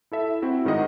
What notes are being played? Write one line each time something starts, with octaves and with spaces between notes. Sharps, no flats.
E4 A4 E5
C4 E4 F#4
G#2 D#3 G#3 D#5 F#5